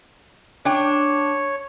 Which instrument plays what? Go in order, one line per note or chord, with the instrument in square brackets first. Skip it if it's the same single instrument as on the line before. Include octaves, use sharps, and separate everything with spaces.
[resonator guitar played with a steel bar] D4 G5 [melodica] C#5